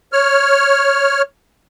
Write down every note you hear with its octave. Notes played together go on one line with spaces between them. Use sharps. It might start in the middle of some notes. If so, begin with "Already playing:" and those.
C#5 F6